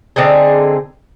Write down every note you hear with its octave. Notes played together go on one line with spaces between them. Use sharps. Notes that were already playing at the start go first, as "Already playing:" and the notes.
D3 C4 D#4 G#4